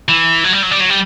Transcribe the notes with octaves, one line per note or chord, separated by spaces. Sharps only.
E3
F#3
G3
F#3
G3
F#3
G3